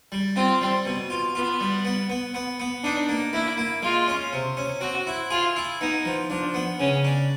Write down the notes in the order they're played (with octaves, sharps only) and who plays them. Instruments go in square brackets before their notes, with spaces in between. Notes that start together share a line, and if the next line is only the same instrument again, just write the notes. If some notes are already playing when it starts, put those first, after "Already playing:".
[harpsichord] G3
[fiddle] C4 [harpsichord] F4
[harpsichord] G3
B2
F4
[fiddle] B3 [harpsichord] F4
[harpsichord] G3
B3
B3
B3
B3
[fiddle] D4 [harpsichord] D#4
[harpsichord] A#3
[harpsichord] A#3 [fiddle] E4
[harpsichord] A#3
[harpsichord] G#3 [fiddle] F4
[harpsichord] C#4
C3
C#4
[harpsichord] C4 [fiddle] F#4
[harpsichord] E4
[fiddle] F4 [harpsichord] G#4
[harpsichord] E4
[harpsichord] B3 [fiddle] D#4
[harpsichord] F3
[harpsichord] F3 [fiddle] D4
[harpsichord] B3
[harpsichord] C#3 [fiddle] C#4
[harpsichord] D4